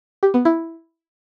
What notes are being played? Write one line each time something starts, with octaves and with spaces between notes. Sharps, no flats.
G4
B3
E4